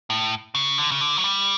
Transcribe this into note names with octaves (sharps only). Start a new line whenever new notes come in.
A2
C#3
D3
C#3
D3
F#3
G3